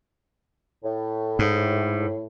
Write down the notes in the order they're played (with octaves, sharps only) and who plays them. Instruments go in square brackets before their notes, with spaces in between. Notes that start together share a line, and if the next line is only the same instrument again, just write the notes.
[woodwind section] A2
[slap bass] G#2